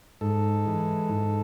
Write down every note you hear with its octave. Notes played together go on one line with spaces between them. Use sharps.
G#2 A4
E3 G#3
G#2